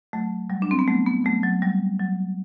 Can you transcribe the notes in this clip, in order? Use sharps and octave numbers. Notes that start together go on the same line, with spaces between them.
F#3 A3
F#3 G3
D4
C4
B3
F#3 A3
B3
F#3 A3
F#3
F#3 G3
F#3